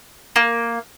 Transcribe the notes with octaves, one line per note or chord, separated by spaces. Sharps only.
A#3